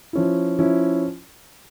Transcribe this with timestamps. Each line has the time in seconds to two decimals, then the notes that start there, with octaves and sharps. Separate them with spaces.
0.13 F3 C#4 E4
0.59 F3 C#4 E4